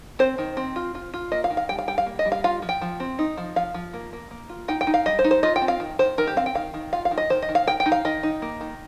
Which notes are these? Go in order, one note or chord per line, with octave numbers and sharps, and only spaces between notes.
C4 C5
D#3
C4
F4
F4
F4
A#3 D#5
F5
D#3
F5
G3 G5
F5
G3 G5
F5
A#3
D#5
G3
F5
F4 F5
F3
G5
F3
C4
D#4
F3
F3 F5
F3
A#3
A#3
A#3
F4
D#4 G5
G5
D#4
F5
G3 D#5
C5
D#4
C5
F4 D#5
G5
C4
F5
D#3
D#3 C5
D#3 A#4
G4
C4 F5
G5
D#3 F5
D#3
F4 F5
F5
D#3
D#5
D#3 C5
D#5
D#3
F5
D#3 G5
G5
D#4
F5
D#3 D#5
D#4
A#3
D#3